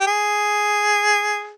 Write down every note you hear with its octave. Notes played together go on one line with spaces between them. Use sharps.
G4
G#4